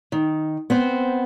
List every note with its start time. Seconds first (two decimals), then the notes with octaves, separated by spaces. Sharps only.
0.12 D#3
0.70 B3 C4 C5